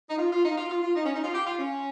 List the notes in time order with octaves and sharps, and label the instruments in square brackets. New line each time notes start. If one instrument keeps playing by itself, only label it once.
[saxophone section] D#4
F4
F4
D#4
F4
F4
F4
D#4
C#4
D#4
F4
G4
F4
C#4